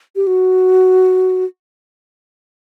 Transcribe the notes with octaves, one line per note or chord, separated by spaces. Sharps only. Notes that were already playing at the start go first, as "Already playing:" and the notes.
G4
F#4